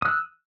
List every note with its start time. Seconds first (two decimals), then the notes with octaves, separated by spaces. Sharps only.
0.02 D#6
0.05 F#6
0.08 E6